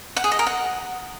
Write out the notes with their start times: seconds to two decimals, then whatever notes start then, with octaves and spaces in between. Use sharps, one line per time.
0.16 F#5
0.24 G#4
0.31 D#5
0.39 A#4
0.46 F#5